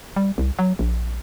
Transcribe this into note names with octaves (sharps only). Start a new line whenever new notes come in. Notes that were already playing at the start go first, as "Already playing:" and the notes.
G3
C2
F#3
A#1